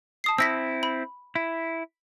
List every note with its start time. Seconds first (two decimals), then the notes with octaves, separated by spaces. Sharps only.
0.24 A5 D#6 C7
0.38 C4 E4 E6 A#6 B6
0.83 B5
1.35 E4